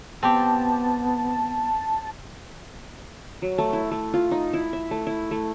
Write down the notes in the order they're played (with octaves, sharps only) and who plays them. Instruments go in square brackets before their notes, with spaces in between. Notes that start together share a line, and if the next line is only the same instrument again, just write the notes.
[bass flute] B3 [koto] C4 G4 [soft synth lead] A5
[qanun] F#3
A3
E4
A3
F4
D#4
E4
E5
A3
E4
A3